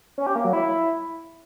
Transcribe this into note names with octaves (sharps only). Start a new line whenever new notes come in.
C#4
G4
A#3
F#3
E4